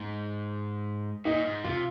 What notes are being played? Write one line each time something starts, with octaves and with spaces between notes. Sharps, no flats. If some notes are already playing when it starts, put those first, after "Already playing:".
Already playing: G#2
A#2 D#4
G#2
C3 F4